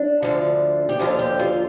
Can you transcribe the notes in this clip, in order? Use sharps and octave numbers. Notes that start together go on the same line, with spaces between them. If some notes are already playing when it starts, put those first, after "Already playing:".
Already playing: D4
D2 D3 F3
G4
D#2 D3 F3 F4
G4
F4